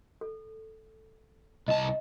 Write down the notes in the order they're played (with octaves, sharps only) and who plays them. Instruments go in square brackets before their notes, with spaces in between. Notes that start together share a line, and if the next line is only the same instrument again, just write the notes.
[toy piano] A4
[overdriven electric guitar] C2 A5 [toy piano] D#5